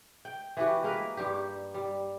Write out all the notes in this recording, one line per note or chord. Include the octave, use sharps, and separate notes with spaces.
G5
E3 B3 F#4 G4
G#3 A#3 A#4 B4
G2 G3 G4
G3